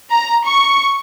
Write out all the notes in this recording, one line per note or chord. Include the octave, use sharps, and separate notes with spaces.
A#5
C#6